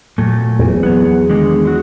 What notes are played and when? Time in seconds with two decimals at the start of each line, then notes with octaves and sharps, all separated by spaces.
0.18 A#2 F#3 A3
0.59 E2
0.83 F#3 B3
1.30 D3 D#3 G#3
1.65 F#3 F#4